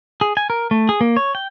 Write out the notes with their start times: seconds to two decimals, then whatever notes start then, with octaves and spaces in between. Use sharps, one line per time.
0.21 G#4
0.37 G#5
0.50 A#4
0.71 A3
0.89 G#4
1.01 A#3
1.17 C#5
1.35 G5